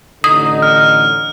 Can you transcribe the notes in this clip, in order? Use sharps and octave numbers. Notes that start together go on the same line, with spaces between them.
A1 D3 D#4 D#6
F6